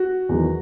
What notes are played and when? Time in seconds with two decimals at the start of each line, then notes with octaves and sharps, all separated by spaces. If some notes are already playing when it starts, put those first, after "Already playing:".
Already playing: F#4
0.29 E2 D#3 F#3